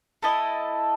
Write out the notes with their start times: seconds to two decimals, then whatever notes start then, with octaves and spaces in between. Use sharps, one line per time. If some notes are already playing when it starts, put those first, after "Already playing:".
0.23 A3 E4 A4 D#5